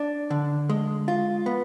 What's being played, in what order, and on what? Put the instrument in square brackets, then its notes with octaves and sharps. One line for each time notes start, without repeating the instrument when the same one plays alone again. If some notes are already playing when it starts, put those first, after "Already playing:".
Already playing: [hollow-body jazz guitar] D4
D3
G#3
F4
B3